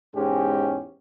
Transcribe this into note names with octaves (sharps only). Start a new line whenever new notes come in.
E2 G#2 G#3 C#4 G4